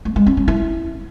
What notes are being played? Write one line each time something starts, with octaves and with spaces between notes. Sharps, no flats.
A3
G#3
C#4
C#4
E4